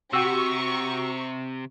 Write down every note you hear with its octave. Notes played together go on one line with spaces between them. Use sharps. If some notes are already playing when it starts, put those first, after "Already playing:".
C3 F#4 G4 A#5 C#6 E6